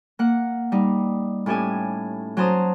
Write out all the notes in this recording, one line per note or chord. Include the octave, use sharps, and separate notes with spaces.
A#3 F#5
G3 D#4
A2 C#4 G4 A4 G#5
F#3 C#4 C5 A5 A#5 D#6